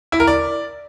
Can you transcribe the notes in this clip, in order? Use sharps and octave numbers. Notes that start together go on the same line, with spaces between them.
E4
A#4
D5